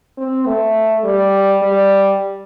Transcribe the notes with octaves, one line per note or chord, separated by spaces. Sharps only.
C4
A3
G3
G3